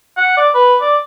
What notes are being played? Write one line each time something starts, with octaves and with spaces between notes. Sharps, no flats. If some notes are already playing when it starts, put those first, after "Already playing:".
F#5
D5
B4
D5